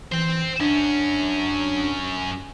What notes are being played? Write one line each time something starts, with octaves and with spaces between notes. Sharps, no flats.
E3 C5 G5
F#2 C#4 D4